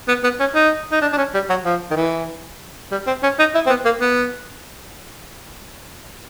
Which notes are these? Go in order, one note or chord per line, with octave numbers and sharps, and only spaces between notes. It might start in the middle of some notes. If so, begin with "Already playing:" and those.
B3
B3
C#4
D#4
D#4
D4
D4
C#4
G3
F#3
F3
D#3
E3
G3
C4
C#4
D#4
E4
C4
B3
A#3
B3